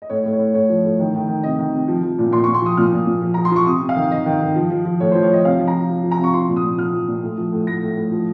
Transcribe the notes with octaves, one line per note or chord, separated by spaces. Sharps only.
D#5
A2 C#5
A2
C#5
A2
A2 C#5
F3
A2
D#3
D#3
D#3
C3 D#5
D#3
C3
F3
F3
A#2
A#2 C6
C#6
A#2
C6
F3 D#6
A#2 F6
A#2
A#2
F3
F3 A#5
C6
F3 C#6
C3 D#6
C3
F5
D#3
D#3 D#5
D#3
D#3
F3
F3
F3
A2 C#5
C5
F3
C#5
F3 D#5
C3 F5
F3
A#5
F3
F3
F3
A#5
C3 C#6
F3 C6
A#2
D#6
A#2
F3 F6
F3
A#2
A2
F3
A2
A2 A#6
A2
A2
F3